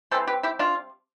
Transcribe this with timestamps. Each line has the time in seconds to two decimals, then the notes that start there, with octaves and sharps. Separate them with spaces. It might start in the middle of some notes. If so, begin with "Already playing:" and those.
0.11 E3 G3 C4 A4 C5
0.27 G4 B4
0.43 E4 G4
0.59 D4 F4